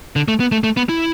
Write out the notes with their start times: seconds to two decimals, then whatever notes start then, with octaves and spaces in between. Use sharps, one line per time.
0.16 D3
0.28 A3
0.40 B3
0.52 A3
0.64 A3
0.77 B3
0.89 E4